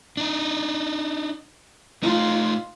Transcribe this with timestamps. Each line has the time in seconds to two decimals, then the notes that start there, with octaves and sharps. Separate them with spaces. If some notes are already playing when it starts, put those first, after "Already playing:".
0.17 D4 D#4
2.03 A3 D#4 F4